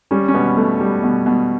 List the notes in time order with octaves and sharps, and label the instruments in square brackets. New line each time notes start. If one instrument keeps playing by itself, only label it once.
[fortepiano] G3 C#4
C#4
B2 B3
B2 A3
G3
B2
B2